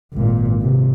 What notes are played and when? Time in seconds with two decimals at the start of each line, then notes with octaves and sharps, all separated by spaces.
0.13 G#1 A#2
0.61 C3